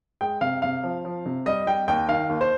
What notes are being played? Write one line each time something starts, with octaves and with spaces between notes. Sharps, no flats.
G#3 G5
C3 F5
C3 F5
F3
F3
C3
G3 D#5
G3 G5
D#2 G5
D#3 F5
D#2
C5